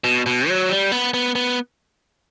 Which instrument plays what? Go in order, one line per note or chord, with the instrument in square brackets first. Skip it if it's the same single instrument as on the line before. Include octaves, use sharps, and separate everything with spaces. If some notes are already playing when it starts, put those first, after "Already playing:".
[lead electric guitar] B2
B2
F#3
G3
B3
B3
B3